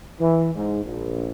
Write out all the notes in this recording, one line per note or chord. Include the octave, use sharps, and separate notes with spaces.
E3
G#2
A#1